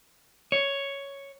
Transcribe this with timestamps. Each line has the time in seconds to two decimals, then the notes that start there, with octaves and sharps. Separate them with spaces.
0.52 C#5